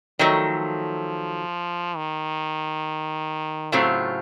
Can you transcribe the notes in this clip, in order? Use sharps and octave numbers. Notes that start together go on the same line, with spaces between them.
D#3 F3 F#3 A3
D#3
A2 C#3 F#3 A3 C4 F4